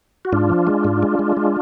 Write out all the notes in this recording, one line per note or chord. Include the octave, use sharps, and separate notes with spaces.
F#4
G#2 D4 F4
F3
G#3
G#2
G#3
G#3
G#3